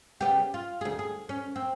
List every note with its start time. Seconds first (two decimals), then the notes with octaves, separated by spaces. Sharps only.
0.21 C#3 B3 G4
0.54 F4
0.81 D2 G#4
0.99 G#4
1.29 C#4
1.56 C4